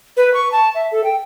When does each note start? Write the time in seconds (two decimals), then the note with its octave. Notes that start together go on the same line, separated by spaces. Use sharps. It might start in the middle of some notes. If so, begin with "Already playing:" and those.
0.17 B4
0.34 C#6
0.52 A5
0.75 E5
0.92 A4
1.04 G5